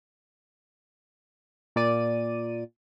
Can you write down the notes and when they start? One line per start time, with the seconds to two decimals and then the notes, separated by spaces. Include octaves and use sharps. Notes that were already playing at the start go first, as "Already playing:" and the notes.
1.76 A#2 D5 D#7